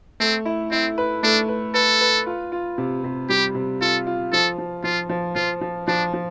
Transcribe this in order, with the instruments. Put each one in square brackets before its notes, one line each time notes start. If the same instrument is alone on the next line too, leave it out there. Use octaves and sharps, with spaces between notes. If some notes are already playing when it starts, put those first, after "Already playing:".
[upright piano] A3 [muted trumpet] C4
[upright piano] E4
[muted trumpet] C4 [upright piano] E4
[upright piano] B4
[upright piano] A3 [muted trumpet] D4
[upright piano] B4
[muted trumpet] A4 [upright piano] B4
[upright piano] B4
F4
F4
C3
C3
[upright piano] G3 [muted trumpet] G4
[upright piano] C3
[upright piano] F4 [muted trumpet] A4
[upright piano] F4
[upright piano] F3 [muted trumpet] A4
[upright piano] F3
[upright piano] F3 [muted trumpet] F4
[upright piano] F3
[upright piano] F3 [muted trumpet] F4
[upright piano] F3
[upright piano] F3 [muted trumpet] D4
[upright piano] F3